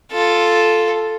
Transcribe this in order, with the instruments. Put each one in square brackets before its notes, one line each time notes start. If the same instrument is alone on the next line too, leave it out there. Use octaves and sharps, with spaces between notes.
[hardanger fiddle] F4 A4